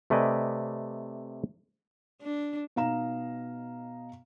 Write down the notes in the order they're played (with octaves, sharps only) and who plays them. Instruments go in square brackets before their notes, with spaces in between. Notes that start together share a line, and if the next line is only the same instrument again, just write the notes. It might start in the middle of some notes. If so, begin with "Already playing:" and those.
[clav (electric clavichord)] C3 A3 B4 D5 D#5 G#5
[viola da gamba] D4
[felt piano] B2 D#4 F5 A#5 E7